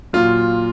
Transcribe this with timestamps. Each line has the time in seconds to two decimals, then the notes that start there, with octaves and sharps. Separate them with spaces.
0.13 A#2 F#3 F4